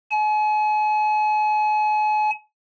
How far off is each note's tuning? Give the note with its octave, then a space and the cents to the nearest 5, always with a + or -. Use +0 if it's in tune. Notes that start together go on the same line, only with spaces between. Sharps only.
G#5 +40